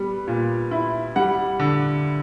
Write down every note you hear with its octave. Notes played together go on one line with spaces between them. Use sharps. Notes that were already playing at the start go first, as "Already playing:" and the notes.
Already playing: G3 B3
A#2
E4
G3 F#5
D3